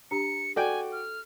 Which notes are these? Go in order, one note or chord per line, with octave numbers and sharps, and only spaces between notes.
D4 G4 A#5 C#7
F#4 A4 D5 G5 G#5
F6